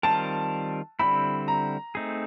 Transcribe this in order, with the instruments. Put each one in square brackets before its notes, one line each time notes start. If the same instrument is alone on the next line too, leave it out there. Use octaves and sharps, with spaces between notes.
[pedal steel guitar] D#3 G3 C4 F4 A#4 [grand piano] A5
[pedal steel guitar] D3 G3 C4 E4 [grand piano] B5
[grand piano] A#5
[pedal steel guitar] A3 C4 D#4 G#4